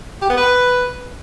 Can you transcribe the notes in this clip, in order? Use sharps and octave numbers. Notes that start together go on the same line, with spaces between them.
G4
B3
B4